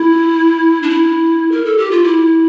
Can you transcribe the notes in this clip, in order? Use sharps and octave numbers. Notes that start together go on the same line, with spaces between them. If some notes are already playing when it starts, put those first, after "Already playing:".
Already playing: E4
D4
E4
A#4
A4
G4
F4
E4